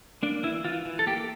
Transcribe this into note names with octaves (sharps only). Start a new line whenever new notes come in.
A#3 D4
E3 E4
E3 F4
E3
A4
A#3 G4